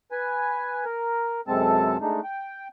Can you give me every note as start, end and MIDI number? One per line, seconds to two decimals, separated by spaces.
0.12 0.84 71
0.12 0.84 80
0.85 1.41 70
1.48 1.97 42
1.48 1.97 48
1.48 1.97 56
1.48 1.97 60
1.48 1.97 69
1.48 1.97 81
2.01 2.20 56
2.01 2.20 57
2.01 2.20 62
2.01 2.20 63
2.24 2.68 79